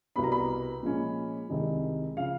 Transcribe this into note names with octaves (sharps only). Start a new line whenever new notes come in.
C2 B2 G3 B3 B5
A#5
B5
A#2 F3 G#3 C#4
C2 C3 D#3 G#3
C#3 F3 F5